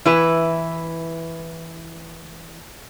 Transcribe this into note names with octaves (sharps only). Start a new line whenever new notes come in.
E3 E4 B4